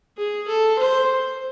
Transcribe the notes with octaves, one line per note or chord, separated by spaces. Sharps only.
G#4
A4
C5